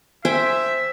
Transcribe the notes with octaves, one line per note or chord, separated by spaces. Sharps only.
C5 E5 G5 G#5